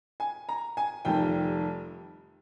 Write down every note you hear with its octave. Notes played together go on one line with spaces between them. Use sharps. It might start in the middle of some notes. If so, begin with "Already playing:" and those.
G#5
A#5
G#5
F1 F2 D#3 G3 G5